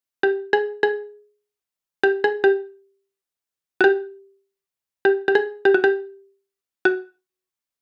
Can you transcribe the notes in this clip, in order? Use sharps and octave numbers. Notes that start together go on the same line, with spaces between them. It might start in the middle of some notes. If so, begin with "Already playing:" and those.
G4
G#4
G#4
G4
G#4
G4
F#4
G4
G4
G4
G#4
G4
F#4
G4
F#4